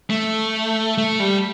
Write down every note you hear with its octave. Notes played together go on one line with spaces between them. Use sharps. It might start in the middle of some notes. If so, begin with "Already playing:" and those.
A3
A3
G3